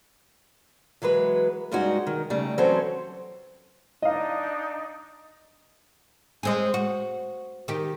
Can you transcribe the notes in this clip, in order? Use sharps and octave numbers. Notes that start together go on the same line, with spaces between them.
E3 F#3 G#3 B4
G2 G3 G#3 C#4 D#4 F#4
D#3
C#3 G3 A3 D#4
E3 F#3 C4 C#4 A4 C5
D4 D#4 D#5 F5
G#3 C4 G#4
F#4
D#3 G4